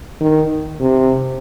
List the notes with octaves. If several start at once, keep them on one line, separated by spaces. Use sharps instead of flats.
D#3
C3